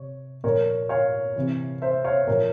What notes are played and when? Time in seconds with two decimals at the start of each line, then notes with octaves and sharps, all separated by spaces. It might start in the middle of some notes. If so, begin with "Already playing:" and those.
Already playing: C3 C#5
0.44 A#2 F3 A#4 C#5
0.89 C#5 F5
1.36 C3 E3
1.82 C5 E5
2.04 C#5 F5
2.27 A#2 F3 A#4 C#5